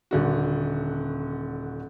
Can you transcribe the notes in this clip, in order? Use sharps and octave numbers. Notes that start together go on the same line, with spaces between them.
D#1 D3 F#4